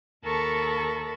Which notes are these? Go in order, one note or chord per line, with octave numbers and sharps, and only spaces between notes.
D#2 A4 A#4 A5 B5 C#6